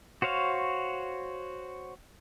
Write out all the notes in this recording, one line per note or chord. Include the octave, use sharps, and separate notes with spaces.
F#4 C5 C#5 F5